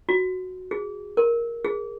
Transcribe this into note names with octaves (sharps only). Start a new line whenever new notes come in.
F#4
G#4
A#4
G#4